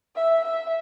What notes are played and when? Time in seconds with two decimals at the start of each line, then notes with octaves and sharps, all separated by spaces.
0.16 E5
0.44 E5